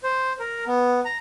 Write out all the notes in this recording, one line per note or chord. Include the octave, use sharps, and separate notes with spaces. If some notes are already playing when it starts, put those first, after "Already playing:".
C5
A#4
B3
A#5